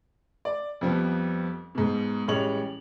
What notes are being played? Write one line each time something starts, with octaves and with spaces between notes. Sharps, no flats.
D5
F2 F3 G3 B3
G#2 B2
A1 G3 G#3 C#5 F7 F#7